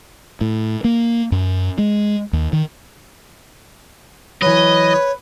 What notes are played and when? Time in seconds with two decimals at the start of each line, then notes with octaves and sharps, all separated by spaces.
0.41 A2
0.84 A#3
1.32 F#2
1.78 G#3
2.33 D#2
2.53 D#3
4.42 E3 F#3 B4 C#5 D#5